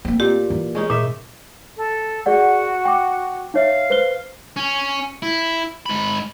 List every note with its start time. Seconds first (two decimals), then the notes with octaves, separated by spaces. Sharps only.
0.05 A#3 C4
0.20 A#2 G4
0.50 E3
0.75 G#3 C#4 D#4
0.90 A#2 D#4 E5
1.77 A4
2.26 F#4 G#4 D5 F#5
2.85 G5 D6
3.54 D#4 C#5 E5 F5
3.90 B4 C5 G7
4.56 C#4
5.22 E4
5.86 G#2 B5